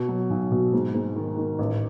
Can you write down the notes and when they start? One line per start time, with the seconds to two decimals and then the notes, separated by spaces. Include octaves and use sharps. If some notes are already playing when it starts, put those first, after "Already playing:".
Already playing: B2
0.08 F#3
0.30 B1
0.52 B2
0.73 G#2
0.94 G#2
1.16 D#3
1.37 D#3
1.59 A1